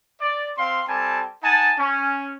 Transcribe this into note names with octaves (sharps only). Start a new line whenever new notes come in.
D5
C4 F5 C6
G3 C4 A4 G#5 A5
D#4 F#5 G#5 A5
C#4